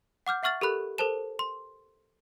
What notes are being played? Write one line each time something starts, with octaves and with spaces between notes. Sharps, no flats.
F#5 D6 F6 G6
E5 F#5 C#6 F6 A6 F#7
G4 A4 A#4 B5 F#6
A4 A#4 C5 A5 E7
C6